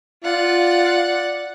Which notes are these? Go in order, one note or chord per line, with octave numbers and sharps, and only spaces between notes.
F4 D5 F#5